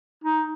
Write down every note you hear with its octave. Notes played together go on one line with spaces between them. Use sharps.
D#4